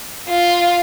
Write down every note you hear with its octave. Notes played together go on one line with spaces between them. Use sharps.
F4